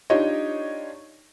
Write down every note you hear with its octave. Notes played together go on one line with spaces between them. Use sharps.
D4 D#4 F4 G4 C#5 D#5